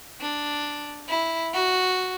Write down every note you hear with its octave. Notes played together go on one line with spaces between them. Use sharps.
D4
E4
F#4